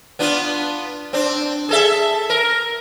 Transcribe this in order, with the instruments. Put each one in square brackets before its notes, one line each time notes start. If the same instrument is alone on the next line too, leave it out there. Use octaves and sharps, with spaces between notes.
[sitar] B3 D4 F4
C4 D4
G#4 A4 E5
A#4